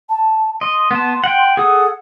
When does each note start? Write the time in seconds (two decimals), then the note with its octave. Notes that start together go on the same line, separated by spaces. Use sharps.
0.09 A5
0.61 D#5 C6
0.91 B3 A5
1.24 F#5 G5
1.57 G#4 A4 F#5 D#6